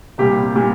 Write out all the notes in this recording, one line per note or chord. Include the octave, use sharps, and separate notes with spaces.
C2 A#2 G3 G4
A#2 G3